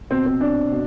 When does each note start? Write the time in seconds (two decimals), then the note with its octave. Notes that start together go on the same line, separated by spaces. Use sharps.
0.10 B2 C4
0.26 C4
0.41 D4
0.71 B2